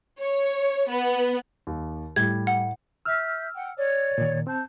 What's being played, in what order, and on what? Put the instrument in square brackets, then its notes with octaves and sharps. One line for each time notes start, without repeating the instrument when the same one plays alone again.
[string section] C#5
B3
[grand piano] D#2
[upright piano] A2 [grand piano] G3 [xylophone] G#6
[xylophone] F#5
[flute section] E5 G6 [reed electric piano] E6 F6
[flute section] F#5 G5
C#5 D5
[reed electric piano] A#2 D#3
[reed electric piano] C4 [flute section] A5 G6